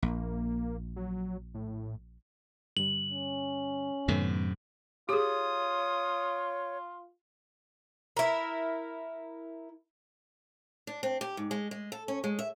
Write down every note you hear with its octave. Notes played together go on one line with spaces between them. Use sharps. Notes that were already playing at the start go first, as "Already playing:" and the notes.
A#1 A#3
F#3
A2
G2 D3 G3 F#7
C#4
F#2 A2 C3 D#3 A3 B3
F4 G4 G#4 C#5 D#6
E4 A#4
D4
C4
G4
G#2
G#3
G#3
A4
C#4
G#3
E5